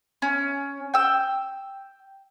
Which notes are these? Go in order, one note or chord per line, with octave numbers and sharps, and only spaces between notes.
C#4
G5 E6